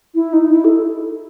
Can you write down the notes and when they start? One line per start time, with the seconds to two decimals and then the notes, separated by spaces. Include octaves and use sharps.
0.15 E4
0.33 D#4
0.52 E4
0.65 A4